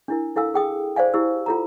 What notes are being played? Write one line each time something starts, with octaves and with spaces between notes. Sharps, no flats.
D4 E4 A#4
E4 A4 F5 G#5 E6
G#4 G5 D#6
C5 D5 F5 G#5
E4 G4 E6
F4 A4 A#5